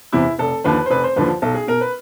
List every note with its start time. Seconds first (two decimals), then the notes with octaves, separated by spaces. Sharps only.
0.12 E2 C3 E4
0.39 F1 A4
0.64 D#2 D3 F3 B4
0.86 C5
0.90 F1 B4
1.04 C5
1.16 D#2 D3 F3 B4
1.42 B1 A4
1.54 G#4
1.67 B2 A#4
1.81 B4